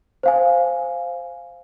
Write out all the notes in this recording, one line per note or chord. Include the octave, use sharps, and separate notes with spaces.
C5 F5 G#5